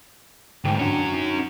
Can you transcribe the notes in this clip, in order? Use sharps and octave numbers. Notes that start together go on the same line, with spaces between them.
D2 G#2 G5
C#4 D4 F#4
D#4